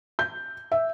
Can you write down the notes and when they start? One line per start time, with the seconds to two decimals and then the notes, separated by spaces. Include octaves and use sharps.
0.19 G6
0.72 E5